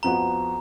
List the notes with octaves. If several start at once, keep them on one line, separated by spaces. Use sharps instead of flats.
F2 F3 B3 F#4 A#5